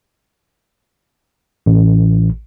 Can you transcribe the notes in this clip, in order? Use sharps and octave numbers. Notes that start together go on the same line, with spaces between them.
A1